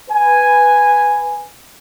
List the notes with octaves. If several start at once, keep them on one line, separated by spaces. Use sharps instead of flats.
B4 G#5